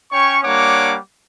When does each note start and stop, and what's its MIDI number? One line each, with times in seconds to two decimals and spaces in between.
0.12 0.39 61
0.12 0.39 73
0.12 0.39 79
0.12 0.39 85
0.44 0.97 55
0.44 0.97 58
0.44 0.97 62
0.44 0.97 73
0.44 0.97 78
0.44 0.97 86